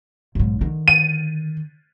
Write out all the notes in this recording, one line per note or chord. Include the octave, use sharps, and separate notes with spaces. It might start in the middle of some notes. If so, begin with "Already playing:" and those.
B1 G#2
D3 D#3
D#7